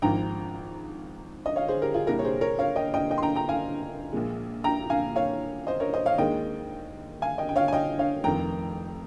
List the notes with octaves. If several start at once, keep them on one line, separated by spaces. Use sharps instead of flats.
G#1 G#2 F3 G5 A#5
D#5
C#5 F5
G#4 C5
G4 A#4
F4 G#4
C2 A#2 G3 G4 A#4
C#5
G#4 C5
A#4 C#5
C#5 F5
D#5 G5
D#5 G5
D#5 G5
C6
G5 A#5
G5 A#5
F5 G#5
A#1 A#2 G#3
G5 A#5
F5 G#5
C#5 F5
C5 D#5
A#4 C#5
C5 D#5
C#5 F5
D#2 D#3 G#3 D#5 G5
F5 G#5
D#5 G5
G5
C#5 F5
G#5
D#5 G5
C#5 F5
F1 F2 D#3 G5 A#5